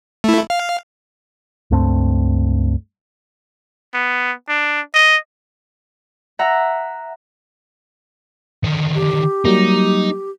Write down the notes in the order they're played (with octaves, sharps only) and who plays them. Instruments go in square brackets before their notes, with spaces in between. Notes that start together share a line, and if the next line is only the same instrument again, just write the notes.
[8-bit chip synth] A3 E4
F5
[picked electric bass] C#2 G2 A3 C4
[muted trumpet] B3
D4
D#5
[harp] E5 F#5 A#5
[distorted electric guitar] D3 D#3
[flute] G4
[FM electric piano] F#3 G3 A#3 [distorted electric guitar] D#4